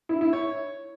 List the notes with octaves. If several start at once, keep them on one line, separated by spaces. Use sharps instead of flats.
E4
E4
C#5